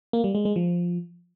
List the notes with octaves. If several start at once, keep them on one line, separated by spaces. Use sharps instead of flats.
A#3
G3
G#3
G#3
F3